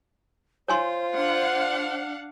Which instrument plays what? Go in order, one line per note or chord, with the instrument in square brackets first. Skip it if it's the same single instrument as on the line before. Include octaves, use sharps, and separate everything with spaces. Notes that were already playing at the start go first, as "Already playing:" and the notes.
[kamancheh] F4 [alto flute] C5 [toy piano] C#5 G#5 C6
[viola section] D4 F5 F#5